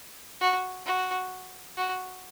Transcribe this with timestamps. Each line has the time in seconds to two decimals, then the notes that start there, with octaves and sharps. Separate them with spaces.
0.41 F#4
0.85 F#4
1.77 F#4